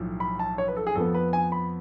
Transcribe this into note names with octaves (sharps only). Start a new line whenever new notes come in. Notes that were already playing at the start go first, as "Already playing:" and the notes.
Already playing: B1 A2 F3
B5
A5
C#5
B4
A4
G#4
F2 F3 B3 A4
B4
G#5
B5